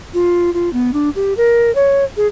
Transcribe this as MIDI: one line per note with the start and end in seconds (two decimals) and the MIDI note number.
0.14 0.53 65
0.54 0.72 65
0.73 0.91 59
0.93 1.10 62
1.16 1.33 67
1.37 1.73 70
1.75 2.04 73
2.17 2.27 68